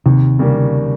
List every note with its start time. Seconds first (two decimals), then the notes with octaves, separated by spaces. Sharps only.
0.06 D#2 C3
0.39 C#3 G3 A#3